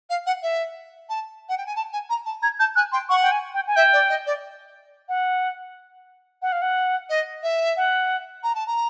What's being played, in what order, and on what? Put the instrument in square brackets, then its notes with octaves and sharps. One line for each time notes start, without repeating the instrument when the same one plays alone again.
[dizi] F5
F#5
E5
A5
F#5
G5
G#5
A5
G#5
A#5
A5
[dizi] A#5 [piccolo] G#6
[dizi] A5 [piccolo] G6
[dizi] G#5 [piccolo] F#6
[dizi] G5 [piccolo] C6
[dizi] F#5 [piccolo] C#6
[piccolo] G5
G#5
G5
G#5
[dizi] E5 [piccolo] G5
[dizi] D5
D#5
D5
[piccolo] F#5
F#5
F5
F#5
[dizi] D#5
E5
[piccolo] F#5
[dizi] A#5
A5
A#5